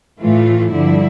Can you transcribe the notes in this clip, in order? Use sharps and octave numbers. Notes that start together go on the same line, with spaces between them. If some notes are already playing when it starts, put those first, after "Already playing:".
A2 E3 A3 F4
G2 D3 F3 E4